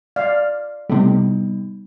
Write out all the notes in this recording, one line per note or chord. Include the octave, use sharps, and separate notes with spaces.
D5 F5
A2 C3 G3 B3 D#4